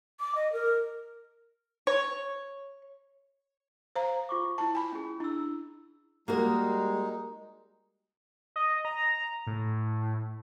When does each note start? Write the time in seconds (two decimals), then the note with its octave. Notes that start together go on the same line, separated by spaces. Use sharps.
0.20 D6
0.35 D#5
0.53 A#4
1.87 C#5
3.96 C5 F5 A#5
4.29 F4 C#6 D6
4.58 E4 A5 A#5
4.75 G#5 B5
4.92 C#4 G#4
5.20 D4 E4 E6
6.28 G3 G#3 A#3 D#4 F#4 A#4
8.56 D#5
8.85 A#5
9.47 A2